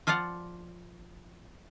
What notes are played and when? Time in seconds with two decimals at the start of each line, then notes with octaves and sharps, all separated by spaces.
0.07 F3 F4 D5 F5 F#5